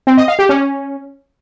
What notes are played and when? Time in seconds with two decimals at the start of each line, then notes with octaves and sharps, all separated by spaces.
0.07 C4
0.17 D#5
0.28 F5
0.39 G4
0.49 C#4